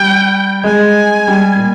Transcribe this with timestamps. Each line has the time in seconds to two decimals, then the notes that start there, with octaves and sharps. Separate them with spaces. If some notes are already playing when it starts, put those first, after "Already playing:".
Already playing: G3 G5
0.64 G#3 G#5
1.28 G3
1.56 A#2